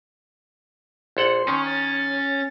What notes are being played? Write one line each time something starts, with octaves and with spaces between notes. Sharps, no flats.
A#1 A4 F#5 C6
D#3 C#4 C#6
C#5 A6